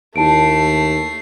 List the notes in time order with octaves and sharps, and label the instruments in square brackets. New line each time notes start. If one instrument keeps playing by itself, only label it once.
[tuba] D#2 [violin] A3 C7 [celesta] E4 A5 D7